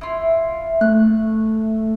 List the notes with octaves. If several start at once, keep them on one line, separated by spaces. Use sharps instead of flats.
E4 F4
A3 F#6